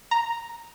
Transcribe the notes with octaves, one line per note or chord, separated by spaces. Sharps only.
A#5